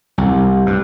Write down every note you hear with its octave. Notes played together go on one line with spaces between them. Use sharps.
C2
G2